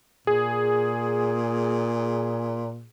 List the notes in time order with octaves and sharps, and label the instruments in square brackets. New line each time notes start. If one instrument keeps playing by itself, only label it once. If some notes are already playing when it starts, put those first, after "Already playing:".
[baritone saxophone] A#2 [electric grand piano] G#4